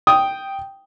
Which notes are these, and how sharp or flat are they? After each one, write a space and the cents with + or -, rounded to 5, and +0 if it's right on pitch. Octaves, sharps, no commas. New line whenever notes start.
G5 +0 D#6 +0